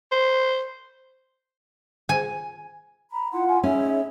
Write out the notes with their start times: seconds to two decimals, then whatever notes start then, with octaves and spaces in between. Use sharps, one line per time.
0.12 C5
2.09 G#5
3.11 A#5 B5
3.33 E4 F4 F#5 C6
3.48 G#5
3.64 C#4 D#4 G#4 C#5 E5